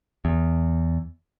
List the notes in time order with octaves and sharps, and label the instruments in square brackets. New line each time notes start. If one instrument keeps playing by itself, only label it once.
[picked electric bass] E2